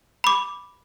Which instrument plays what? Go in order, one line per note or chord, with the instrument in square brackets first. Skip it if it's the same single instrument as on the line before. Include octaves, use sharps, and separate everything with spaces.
[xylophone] B5 D6